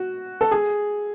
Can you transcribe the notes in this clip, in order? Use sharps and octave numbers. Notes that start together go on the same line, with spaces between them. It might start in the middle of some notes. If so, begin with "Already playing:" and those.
Already playing: F#4
A4
G#4